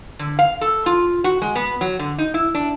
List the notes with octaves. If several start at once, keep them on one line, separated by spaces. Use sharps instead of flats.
D3
F5
A4
F4
F#4
G#3
B3
F#3
D3
D#4
E4
D4